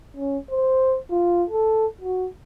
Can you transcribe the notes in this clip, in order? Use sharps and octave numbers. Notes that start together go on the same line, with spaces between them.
C#4
C5
F4
A4
F#4